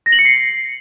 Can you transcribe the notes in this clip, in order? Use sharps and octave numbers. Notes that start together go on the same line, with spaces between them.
A#6
F#7
C#7
C7